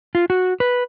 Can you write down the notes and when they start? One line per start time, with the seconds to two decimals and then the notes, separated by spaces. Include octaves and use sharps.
0.15 F4
0.30 F#4
0.60 B4